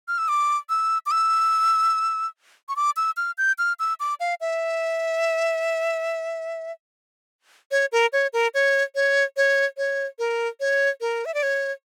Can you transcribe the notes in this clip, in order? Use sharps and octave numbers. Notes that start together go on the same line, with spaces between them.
F6
E6
D6
E6
D6
E6
C#6
D6
E6
F6
G6
F6
E6
D6
F5
E5
C#5
A#4
C#5
A#4
C#5
C#5
C#5
C#5
A#4
C#5
A#4
E5
D5
C#5